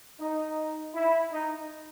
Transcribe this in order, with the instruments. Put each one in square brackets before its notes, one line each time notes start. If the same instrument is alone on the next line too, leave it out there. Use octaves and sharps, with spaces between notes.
[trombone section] D#4
E4
D#4